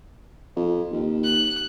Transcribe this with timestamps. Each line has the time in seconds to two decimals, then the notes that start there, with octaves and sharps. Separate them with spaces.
0.56 F2
0.92 D#2
1.24 F#6